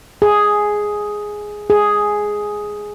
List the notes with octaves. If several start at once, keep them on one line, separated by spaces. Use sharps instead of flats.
G#4
G#4